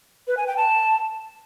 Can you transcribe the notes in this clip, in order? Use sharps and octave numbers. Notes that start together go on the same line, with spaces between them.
B4
G#5
G5
A5